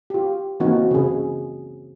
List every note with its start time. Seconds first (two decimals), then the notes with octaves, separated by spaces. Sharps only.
0.10 F4 G4
0.60 E3 A#3 C4 D#4 F#4
0.91 C#3 G#4